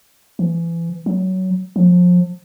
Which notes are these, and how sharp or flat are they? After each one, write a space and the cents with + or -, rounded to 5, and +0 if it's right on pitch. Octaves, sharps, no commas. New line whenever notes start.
E3 +30
F#3 +15
F3 +30